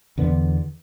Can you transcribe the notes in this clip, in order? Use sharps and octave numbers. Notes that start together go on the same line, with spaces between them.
E2 D3 B3 D4